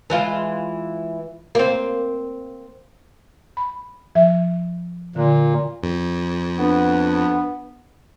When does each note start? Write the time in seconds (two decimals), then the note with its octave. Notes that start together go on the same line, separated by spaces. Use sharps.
0.10 E3 G#3 F4
1.55 A#3 C4
3.57 B5
4.15 F3 E5
5.16 A#2 D3
5.83 F2
6.58 B3 D4